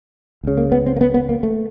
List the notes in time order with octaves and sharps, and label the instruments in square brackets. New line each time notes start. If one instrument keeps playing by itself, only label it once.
[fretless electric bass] C#2 C#3
A#3
B3
C4
A#3
B3
B3
A#3
A3